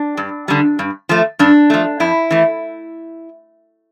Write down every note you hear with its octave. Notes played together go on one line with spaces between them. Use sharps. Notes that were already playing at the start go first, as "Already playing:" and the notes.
Already playing: D4
G2
D3 G3
G2
F3 A3
G2 D4
F3 A3
F2 E4
E3 A3